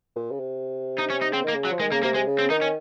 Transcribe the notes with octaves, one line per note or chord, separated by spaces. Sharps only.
A#2
C#3
C3
D#4
C#4
D#4
C#3 C4
D#3 A#3
C#3
F#3
F3
D#3 G#3
C#3 A#3
C3 A#3
C3 G#3
C#3
C4
D#3 D#4
C#4